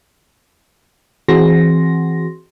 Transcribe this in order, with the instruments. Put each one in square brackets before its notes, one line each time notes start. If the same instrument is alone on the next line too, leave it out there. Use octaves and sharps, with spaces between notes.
[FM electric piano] E3 C4 F#4 G#4 C6 A#6